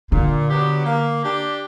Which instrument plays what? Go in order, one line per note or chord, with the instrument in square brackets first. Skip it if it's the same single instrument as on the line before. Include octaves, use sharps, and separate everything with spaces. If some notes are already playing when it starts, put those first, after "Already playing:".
[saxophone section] A#2 [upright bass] D3
[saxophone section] F#3 B3 D4 G4
A#3
D4 G4